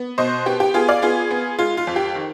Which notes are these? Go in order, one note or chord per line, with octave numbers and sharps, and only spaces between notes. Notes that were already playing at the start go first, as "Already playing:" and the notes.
Already playing: B3
B2 C5 D#5
B3 G4
G4
B3 F4 G#4
D5 F5
B3 F4 G#4
B3
G#3 F4
F4
F2
G4
D#3